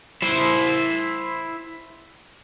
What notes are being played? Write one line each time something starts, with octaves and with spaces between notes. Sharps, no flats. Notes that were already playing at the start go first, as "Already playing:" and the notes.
E4 C5